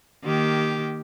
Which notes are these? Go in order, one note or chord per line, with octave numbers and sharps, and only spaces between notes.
D#3 A#3 G4